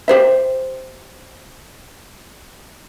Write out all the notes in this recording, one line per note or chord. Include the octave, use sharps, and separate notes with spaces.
G4 C5 E5